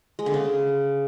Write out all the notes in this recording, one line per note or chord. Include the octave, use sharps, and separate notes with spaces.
G#3
D3
C#3